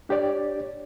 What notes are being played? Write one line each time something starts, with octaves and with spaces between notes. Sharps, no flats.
D4 G4 C#5 D5